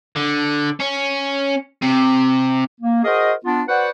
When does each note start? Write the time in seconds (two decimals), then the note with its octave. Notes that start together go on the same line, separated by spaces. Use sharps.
0.16 D3
0.80 C#4
1.82 C3
2.81 A#3
3.04 F#4 G#4 A#4 C5 D#5
3.45 B3 D4 F4
3.68 F#4 B4 C5 D5 F#5